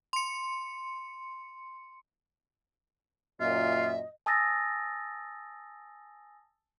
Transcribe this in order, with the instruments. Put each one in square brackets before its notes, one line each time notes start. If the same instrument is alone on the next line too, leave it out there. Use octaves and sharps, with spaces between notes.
[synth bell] C6 C#7
[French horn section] F#2 A#2 [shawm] F4 [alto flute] D#5 [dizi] E5
[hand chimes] G#5 A5 D#6 E6 A6 A#6